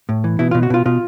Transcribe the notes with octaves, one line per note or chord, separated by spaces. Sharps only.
A2
E3
B2 E4
F4
B2
F#4
B2 F4
B2 F4